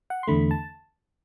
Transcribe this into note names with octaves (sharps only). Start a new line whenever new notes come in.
F#5
C6
E2 D3 A3 B5
A5